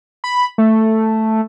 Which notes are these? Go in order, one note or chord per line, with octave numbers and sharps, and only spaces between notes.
B5
A3